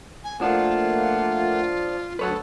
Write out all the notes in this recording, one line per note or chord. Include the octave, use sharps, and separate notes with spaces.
G#5
F3 A3 A#3 D4 F4 F#5
D2 F#3 A4 B4 C#5 F#5